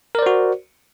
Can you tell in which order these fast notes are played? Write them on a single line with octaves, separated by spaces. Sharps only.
A#4 D5 C5 F#4